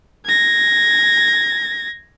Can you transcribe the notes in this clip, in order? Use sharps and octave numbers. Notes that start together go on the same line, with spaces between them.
G#6 A#6